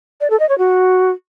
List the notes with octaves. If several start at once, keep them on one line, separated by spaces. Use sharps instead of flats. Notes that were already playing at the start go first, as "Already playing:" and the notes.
D5
A4
D#5
C#5
F#4